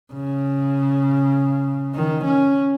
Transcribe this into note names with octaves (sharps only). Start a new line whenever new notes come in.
C#3
D#3
C#4